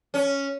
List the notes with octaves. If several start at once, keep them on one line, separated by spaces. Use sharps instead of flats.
C#4